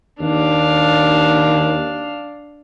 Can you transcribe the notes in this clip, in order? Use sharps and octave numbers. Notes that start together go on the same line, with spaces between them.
D#2 D4 F5